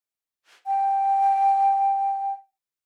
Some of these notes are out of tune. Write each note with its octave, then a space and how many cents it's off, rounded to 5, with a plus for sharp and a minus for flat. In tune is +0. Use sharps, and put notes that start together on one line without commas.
G5 +5